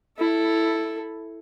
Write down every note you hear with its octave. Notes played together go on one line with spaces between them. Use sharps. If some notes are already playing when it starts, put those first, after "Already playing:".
E4 A4